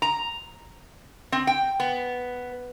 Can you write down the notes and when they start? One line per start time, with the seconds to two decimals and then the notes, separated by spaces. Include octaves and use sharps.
0.02 A#5
1.32 C4
1.47 G5
1.80 B3